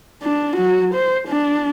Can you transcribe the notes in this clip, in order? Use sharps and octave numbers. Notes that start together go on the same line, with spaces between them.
D4
F#3 F#4
C5
D4